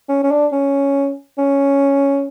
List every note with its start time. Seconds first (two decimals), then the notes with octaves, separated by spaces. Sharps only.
0.09 C#4
0.24 C#4
0.31 D4
0.52 C#4
1.38 C#4